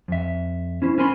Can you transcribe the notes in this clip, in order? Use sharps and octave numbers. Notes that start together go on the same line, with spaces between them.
F2 E5
C#4 E4 C5
C#4 A#4 C5 G#5 B5 C6